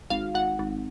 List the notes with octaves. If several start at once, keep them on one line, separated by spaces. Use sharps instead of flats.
G#1 F5
G#1 F#5
G#1